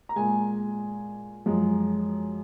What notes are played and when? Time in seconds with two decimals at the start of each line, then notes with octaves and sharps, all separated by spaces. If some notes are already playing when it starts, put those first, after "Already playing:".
0.09 A#5
0.16 A#2 G#3 G#5
1.46 F#2 F3 G#3